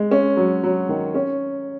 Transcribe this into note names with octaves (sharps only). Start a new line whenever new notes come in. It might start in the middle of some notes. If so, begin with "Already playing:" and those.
Already playing: G#3
C#4
F#3
F#3
D#3
C#4